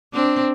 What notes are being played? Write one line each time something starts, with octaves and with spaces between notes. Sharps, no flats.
C4 D4